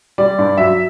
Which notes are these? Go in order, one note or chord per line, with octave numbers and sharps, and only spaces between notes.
G3 D5
G2
F#3 E5